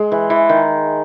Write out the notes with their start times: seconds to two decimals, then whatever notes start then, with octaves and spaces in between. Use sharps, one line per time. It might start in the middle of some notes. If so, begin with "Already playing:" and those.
Already playing: G#3
0.12 E3
0.30 E3
0.49 D#3